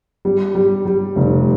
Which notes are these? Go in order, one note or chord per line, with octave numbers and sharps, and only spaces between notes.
G3
G3
G3
F1